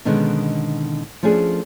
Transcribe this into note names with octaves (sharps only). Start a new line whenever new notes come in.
B2 D3 D#3 G#3 B3 C#4
F3 A3 C#4 D4 G#4